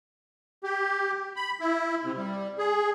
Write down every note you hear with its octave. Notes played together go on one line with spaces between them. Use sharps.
G4
B5
E4
C3
G3
G#4